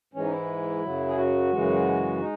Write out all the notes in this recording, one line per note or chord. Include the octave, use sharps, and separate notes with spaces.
G#2 E3 G#3 C#4
D#4
E4
F#2 C#3 F#3
G#4
F#4
F#2 C#3 E3 G#3
G#3 D#4